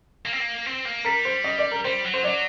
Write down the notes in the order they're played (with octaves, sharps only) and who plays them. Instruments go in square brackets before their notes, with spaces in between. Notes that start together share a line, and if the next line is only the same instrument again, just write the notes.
[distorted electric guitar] A#3
C4
A#3
C4
A#3
[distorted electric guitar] G3 [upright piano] A#4
[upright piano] C5
D#5
D5
A#4
[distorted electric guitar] G3 [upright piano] C5
[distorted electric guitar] F#3
[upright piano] C5
[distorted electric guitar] F#3 [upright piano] D5